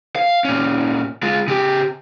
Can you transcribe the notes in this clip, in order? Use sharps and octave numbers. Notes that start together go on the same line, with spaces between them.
F5
A#2 C#4
G#3 F4
C#3 G4